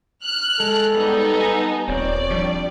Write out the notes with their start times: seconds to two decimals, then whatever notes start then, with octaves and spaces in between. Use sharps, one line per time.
0.24 F6 F#6
0.60 G#3 A4
0.95 G3 B3 D#4
1.41 G#5
1.88 D#1 C4 C#5 D5
2.31 F2 F3 G3 D4